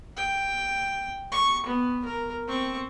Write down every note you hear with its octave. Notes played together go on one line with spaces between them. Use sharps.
G5
C#6
B3
A#4
C4 C#6